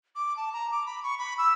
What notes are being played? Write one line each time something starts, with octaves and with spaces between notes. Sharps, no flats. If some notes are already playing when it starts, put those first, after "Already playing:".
D6
A5
A#5
D6
B5
C#6
B5
E6